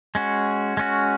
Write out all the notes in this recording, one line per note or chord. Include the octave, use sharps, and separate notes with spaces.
G#3 C#4 F#4
G#3 C#4 F#4